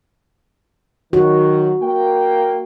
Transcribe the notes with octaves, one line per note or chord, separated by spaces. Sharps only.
D#3 F#3 F#4
A#3 G5